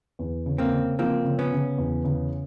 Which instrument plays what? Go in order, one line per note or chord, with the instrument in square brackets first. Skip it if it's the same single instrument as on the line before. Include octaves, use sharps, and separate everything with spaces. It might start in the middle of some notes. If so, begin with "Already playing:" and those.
[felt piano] E2
C#3
[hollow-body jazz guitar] A#3 C4
[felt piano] C#3
[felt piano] F3 [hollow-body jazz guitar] A#3 C4
[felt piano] C#3
[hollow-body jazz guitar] B3 C#4
[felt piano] C#3
E2
C#3